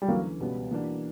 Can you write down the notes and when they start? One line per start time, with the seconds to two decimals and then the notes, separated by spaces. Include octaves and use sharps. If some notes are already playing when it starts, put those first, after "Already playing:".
0.02 G3
0.08 D2 C#3 E3 F#3 A#3
0.40 C#2 B2 G3 B3
0.71 E3 A#3 D4 F#4